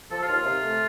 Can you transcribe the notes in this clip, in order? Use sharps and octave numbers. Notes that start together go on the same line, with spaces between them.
F3 A4
F4
D#2
F4
C3
A3